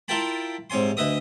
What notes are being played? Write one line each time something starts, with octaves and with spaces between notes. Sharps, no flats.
E4 F4 A#4 G5 A5 B5
G#2 C3 C#5 G#5 C6
D2 B4 D#5 E5 D#6